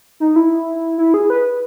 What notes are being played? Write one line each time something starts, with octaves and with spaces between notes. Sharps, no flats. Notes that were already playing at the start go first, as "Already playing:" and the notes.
D#4
E4
E4
G#4
B4